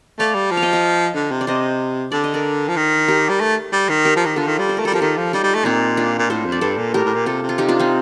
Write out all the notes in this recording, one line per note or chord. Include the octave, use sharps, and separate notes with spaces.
A3 D5 F5
G3
F3
F5
D#5 G5
D#5 G5
D3
C3
D5
C3 C5 D#5
D3 D5
D#5
A#4 D5
F3
D#3
G4 A#4
G3
A3
G3
D#3
G4 A#4
F3
D#3
D3 F4 A4
D#3
G3
C5
A3 A#4
G3 A4
F3 G4 A#4
D#3 F4 A4
F3
G3 D#4 G4
G3
A3
A#2 C4 D#4
D4 F4
A#2
A2 A4 C5
F2
D5
G2 A4 C5
A#2
A2 G4 A#4
A2
A#2
C3 F4 A4
C3
F4
D#4 G4
D4 F4
C4 D#4